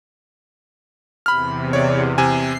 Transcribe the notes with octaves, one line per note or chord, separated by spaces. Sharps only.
E2 C3 B5 F6
C#5 D5
C3 G#5 C7